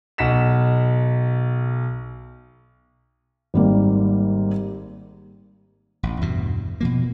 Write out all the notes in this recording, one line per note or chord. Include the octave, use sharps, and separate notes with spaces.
B1 F#5 B6 E7
G#1 G3 A#3
A1
E2 G2 B2
B2 F3 A#3